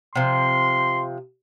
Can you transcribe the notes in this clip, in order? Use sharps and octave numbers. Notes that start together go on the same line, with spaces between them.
C3 F3 C6